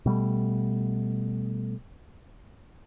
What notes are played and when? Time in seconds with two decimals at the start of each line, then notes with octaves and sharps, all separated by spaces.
0.06 B2 G3 A3